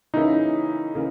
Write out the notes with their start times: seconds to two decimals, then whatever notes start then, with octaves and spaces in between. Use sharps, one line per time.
0.14 C#3 E3 A#3 C#4 D#4 E4
0.95 C#3 E3 A#3